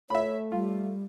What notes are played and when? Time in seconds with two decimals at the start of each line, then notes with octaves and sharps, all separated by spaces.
0.10 A3 C#5 E5 B5
0.52 G3 F4